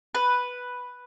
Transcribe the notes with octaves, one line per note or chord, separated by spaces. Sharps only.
B4